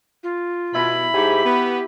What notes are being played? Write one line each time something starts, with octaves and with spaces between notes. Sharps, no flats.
F4
B2 E4 B5
G#2 G4 G#5
B3